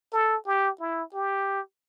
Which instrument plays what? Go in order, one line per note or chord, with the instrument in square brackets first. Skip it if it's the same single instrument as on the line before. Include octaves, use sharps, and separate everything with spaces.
[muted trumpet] A4
G4
E4
G4